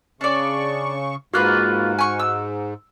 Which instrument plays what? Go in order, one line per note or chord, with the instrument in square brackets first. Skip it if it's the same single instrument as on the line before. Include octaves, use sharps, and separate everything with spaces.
[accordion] C#3 C#6 [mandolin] D4 D5
[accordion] G#2 [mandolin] A#3 F4 B4 [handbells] F#4 F6 F#6
[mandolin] G#5 C#6
E6